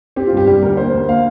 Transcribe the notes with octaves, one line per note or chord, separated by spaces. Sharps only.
C4 G4
F4
G2 G4
G3 G4
D2 A#4
A#3 C5
D2
A#3 F5